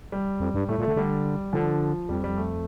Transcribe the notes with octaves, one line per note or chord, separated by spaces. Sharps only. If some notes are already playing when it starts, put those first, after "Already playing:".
G3
F2
G2
A2 A3
A#2
D3 A3
D3 G3
D3 F3
F2 G3
G3
A3